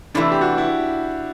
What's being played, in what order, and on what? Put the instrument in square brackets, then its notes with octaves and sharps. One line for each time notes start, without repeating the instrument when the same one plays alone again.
[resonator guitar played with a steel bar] E2 C3 E3 A3 [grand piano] D4
[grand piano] G4
F#4
E4